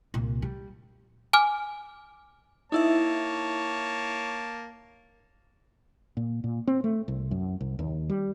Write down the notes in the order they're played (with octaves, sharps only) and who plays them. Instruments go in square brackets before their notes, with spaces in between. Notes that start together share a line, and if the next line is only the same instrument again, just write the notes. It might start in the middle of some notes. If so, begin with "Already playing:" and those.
[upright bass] C2 A#2
G3
[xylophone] G#5 D6 F6
[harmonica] A#3 C#5 A5 [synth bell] D#4 E4 E5
[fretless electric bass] A#2
A#2
C4
A3
C2
F#2
C2
D#2
G3